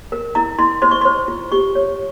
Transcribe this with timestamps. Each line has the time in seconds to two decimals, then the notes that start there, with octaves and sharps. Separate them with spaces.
0.12 A#4
0.35 E4 A#5
0.59 E4 C6
0.82 C5 C6
0.91 C#6
1.01 C5 C6
1.28 F4
1.52 G4 C#6
1.75 C#5